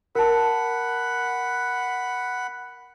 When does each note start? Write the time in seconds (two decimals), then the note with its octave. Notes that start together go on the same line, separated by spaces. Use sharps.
0.15 A#4 F#5 A5 B5